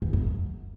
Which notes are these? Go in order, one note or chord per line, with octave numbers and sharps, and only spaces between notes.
E2
F#2